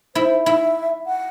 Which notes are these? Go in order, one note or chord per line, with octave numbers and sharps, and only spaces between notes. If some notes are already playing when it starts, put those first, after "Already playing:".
E4 C5
E4 E5
F#5